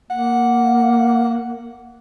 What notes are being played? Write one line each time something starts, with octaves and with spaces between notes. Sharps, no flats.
A#3 F#5